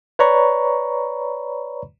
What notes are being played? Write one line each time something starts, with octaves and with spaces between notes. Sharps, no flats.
B4 C#5 D5 A#5 B5 C#6